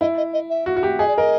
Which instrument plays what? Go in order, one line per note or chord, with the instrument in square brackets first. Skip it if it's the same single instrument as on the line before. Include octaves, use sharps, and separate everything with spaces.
[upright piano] E4 [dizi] D#5
[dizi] D#5
D#5
E5
[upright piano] F#4
F#4
G4
[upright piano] G#4 [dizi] D#5
[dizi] D5
[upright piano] A#4 [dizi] D#5